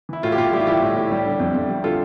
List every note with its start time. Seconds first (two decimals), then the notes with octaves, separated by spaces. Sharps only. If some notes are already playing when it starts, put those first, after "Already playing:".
0.09 E3 E4
0.23 A2 F4
0.32 G4
0.38 A2 F4
0.53 G3 E4 G4
0.61 F4
0.67 E3 E4 G4
0.82 A2
0.96 A2
1.12 G3
1.26 D3
1.40 F2
1.55 F2
1.70 G3
1.84 D3 F4 A4